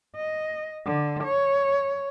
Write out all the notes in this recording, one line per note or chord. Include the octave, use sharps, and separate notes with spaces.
D#5
D3
C#5